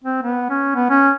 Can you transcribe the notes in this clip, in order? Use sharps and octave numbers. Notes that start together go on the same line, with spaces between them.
C4
B3
C#4
B3
C#4